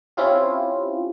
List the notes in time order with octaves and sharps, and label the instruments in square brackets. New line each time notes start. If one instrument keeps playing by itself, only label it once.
[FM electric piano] C4 C#4 E4 F4 G4